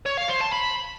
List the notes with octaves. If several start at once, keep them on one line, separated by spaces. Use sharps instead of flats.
C#5
F5
C5
A5
B5